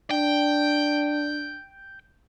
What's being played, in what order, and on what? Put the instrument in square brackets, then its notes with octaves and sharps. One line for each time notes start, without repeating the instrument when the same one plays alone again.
[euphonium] D4 [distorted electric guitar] G5